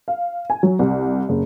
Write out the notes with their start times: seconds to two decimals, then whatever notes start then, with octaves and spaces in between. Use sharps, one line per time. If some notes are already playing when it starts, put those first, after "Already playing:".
0.08 F5
0.50 G#5
0.63 F#3
0.79 C2
1.29 F#1